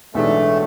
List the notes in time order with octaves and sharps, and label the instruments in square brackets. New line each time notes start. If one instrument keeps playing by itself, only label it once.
[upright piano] B1 A2 E3 G#3 D4 [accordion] A3